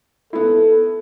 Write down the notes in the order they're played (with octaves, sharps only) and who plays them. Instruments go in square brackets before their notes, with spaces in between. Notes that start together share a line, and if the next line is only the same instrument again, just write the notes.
[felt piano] B3 E4 [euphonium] A4